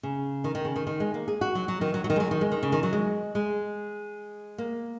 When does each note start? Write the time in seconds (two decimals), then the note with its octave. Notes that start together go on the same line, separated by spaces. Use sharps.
0.03 C#3
0.44 D#3
0.55 D#3
0.65 C#3
0.76 D#3
0.87 D#3
1.00 G#3
1.14 A#3
1.28 G#4
1.41 F#4
1.55 F#3
1.68 F#3
1.81 D#3
1.94 F#3
2.04 F#3
2.10 D#3
2.16 G#3
2.20 F#3
2.31 D#3
2.41 G#3
2.52 D#3
2.63 C#3
2.72 D#3
2.83 F#3
2.93 G#3
3.35 G#3
4.58 A#3